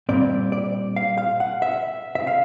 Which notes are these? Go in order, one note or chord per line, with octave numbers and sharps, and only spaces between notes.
A#2 G3 C4 D5
D5
F5
F5
F#5
E5
E5
F5